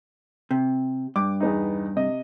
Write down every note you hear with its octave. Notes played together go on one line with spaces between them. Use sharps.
C3
G2 D6
E2 B3 D#4
C3 D#5